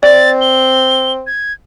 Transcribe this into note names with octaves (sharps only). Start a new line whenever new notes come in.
C4 D5 A6
G7
G#6